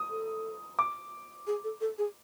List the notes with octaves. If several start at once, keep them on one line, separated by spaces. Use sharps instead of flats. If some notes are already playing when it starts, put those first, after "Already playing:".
Already playing: D#6
A4
D6
G#4
A4
A4
G#4